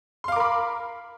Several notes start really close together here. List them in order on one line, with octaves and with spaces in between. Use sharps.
C6 F5 D6 A#4 B5